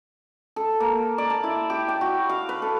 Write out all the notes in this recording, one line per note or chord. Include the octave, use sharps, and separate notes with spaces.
A4
A#3
D5
A5
E4
G4
G5
F#4
F5
B4
A4